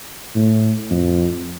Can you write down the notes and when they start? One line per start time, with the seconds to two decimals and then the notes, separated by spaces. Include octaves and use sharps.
0.35 A2
0.91 F2